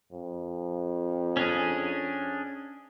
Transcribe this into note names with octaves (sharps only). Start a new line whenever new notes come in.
F2
C#4 D4 G#4